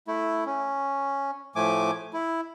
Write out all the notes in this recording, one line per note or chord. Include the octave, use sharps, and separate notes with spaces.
A3 E4
C#4
A2 F3 A3 G#5 D6
E4